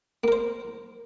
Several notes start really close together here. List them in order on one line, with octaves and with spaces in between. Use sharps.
A#3 A#4 C5